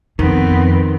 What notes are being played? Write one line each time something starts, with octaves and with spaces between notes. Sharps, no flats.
F2 D#3 B3 C4